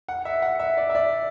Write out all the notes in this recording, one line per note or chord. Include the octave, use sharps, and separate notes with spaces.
F#5
E5
F#5
E5
D5
E5
D5